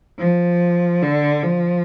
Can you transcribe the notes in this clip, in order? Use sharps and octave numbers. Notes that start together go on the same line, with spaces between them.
F3
D3
F3